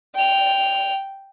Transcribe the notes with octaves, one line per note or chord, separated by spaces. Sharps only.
G5 F7